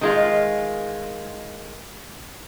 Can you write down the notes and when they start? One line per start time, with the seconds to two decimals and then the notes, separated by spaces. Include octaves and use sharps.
0.01 D#3 G#3 F4